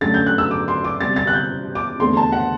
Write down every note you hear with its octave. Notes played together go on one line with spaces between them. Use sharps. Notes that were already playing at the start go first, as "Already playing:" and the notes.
F#2 D3 F#3 A3 A6
G6
F#6
E6
D6
C6
D6
C3 G3 C4 A6
A6
F#6
G6
D6
E2 D3 A3 C4 C6
A5
F#5